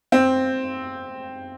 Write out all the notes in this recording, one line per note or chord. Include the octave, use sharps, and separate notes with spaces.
C4